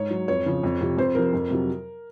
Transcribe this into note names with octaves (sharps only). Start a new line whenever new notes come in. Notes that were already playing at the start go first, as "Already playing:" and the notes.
Already playing: G#2 C#5
F#3
F2 C#5
C#3 F3
F2
C3 F3
F2 C5
C3 F3 A#4
F2
C3 F#3